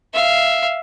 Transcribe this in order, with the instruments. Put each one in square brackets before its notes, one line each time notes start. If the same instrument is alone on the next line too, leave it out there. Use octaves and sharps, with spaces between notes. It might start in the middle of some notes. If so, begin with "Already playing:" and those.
[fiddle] E5 F5